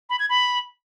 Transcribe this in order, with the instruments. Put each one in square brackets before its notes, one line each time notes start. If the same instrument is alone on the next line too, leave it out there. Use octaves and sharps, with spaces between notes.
[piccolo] B5
G#6
B5